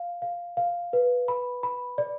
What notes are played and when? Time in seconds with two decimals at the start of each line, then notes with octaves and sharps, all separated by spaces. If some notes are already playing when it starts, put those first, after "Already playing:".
Already playing: F5
0.22 F5
0.57 F5
0.93 B4
1.28 B5
1.63 B5
1.98 D5